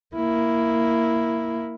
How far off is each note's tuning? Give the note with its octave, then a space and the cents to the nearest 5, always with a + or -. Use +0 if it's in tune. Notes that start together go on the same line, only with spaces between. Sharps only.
A#3 +0 E4 +0